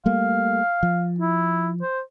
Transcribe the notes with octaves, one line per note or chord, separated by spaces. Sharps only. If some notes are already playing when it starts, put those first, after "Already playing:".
G3 A3 A#3 F5
F3
E4
C5